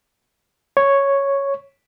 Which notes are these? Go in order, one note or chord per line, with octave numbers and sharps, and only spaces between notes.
C#5